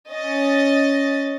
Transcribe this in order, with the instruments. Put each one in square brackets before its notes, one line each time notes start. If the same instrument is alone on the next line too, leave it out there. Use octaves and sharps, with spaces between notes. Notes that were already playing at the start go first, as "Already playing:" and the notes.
[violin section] C#4 D#5 A6